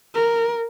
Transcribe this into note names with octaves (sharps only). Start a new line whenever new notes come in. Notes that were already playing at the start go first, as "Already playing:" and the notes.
A#4